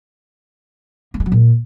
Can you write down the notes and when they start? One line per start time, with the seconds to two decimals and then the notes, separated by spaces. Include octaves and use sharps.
1.14 A#3
1.20 G#3
1.26 F#3
1.32 A#2